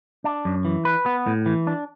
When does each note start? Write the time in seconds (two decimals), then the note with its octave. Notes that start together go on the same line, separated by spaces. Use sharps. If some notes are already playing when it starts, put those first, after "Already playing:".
0.24 D4
0.45 F#2
0.65 E3
0.85 B4
1.06 B3
1.27 A2
1.46 E3
1.67 D4